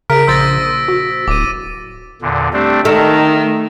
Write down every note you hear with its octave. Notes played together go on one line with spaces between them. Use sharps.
C#3 A#4 B6 D7
A#1 C5 D#6 E6 A6 A#6
F#4
D1 D6 D#7
E2 A#2 D3
G3 A3 C4 D4
D#3 A3 D#4 A#4 E6 F6